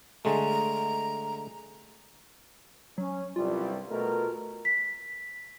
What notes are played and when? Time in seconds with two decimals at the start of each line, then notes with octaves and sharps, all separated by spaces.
0.25 D3 G#3 A3 A#5
2.98 F#3 C#4
3.36 C2 G2 G3 F4
3.89 B2 A3 A#4
4.65 B6